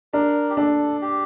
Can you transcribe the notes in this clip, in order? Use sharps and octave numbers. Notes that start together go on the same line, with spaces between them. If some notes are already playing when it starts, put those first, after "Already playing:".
D4 A#4
G4
D4 A4
G4